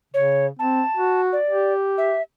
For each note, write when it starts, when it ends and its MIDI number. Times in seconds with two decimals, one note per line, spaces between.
0.14 0.49 49
0.14 0.46 73
0.59 0.82 60
0.59 1.21 81
0.97 1.37 66
1.33 1.73 74
1.50 2.17 67
1.98 2.22 76